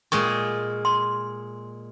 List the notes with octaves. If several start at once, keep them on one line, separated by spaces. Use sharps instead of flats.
A#2 G#3 C#6
C6